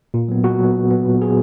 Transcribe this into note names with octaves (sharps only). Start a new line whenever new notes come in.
A#2
F#3 B3
A#2 F#4
F#3 B3
A#2
F#3 B3
A#2
F#3 B3 G#4